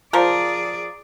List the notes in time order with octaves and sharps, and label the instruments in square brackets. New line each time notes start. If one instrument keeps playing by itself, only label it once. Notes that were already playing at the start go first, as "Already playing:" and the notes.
[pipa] F3 A#4 [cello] G#4 D5